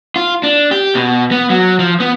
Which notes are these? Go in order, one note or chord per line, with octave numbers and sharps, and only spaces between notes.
F4
D4
G4
B2
B3
F#3
F3
B3